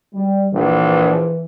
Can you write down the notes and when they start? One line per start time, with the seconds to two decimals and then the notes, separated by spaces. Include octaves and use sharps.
0.14 G3
0.54 A#1 E3